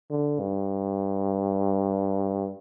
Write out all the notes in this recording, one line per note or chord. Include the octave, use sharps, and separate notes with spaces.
D3
G2